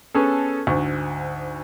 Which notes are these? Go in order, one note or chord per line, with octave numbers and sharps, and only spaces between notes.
B3 C#4 G#4 A4
D2 G#2 C#6